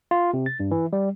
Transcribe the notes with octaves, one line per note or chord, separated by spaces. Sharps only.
F4
C3
A6
G2
E3
G3